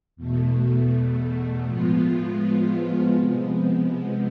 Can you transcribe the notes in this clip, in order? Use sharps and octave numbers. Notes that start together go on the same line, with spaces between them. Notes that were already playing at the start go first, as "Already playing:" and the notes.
E2 B2 A3
A2 F3 G#3 B3 F4
C3 F3 G#3 B3